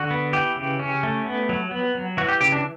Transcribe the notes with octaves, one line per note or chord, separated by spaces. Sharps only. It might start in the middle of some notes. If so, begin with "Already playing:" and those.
Already playing: D3 F#4
B3
E3 G4
C#3
C#4
A3
B3
F#3
B3
F#3
E3 F#4
G4
C#3 G4
D4